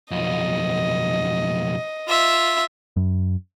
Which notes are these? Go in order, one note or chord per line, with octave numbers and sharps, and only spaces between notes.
B1 F2 D#5
F4 E5
F#2